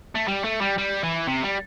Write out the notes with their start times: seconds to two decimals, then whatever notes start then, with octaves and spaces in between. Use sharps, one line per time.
0.15 A3
0.28 G3
0.45 A3
0.61 G3
0.78 G3
1.03 E3
1.28 C3
1.44 G3